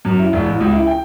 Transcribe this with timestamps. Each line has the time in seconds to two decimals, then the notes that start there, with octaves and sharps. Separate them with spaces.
0.05 F#2
0.19 E4
0.33 E1
0.46 A1
0.60 C#2
0.73 E4
0.87 G5